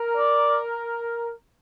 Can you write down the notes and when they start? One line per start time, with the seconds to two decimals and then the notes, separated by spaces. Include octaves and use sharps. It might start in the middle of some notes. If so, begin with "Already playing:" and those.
Already playing: A#4
0.17 D5